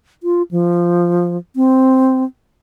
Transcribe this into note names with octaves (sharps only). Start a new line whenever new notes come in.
F4
F3
C4